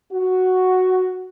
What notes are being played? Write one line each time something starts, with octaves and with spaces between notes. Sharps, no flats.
F#4